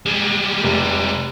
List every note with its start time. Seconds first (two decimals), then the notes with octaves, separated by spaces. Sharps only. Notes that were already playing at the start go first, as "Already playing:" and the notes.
0.06 G3 G#3
0.63 F1